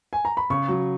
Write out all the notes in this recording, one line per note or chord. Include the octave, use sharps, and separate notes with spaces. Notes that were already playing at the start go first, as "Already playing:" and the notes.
G#5
A#5
B5
C#3 C#6
F#3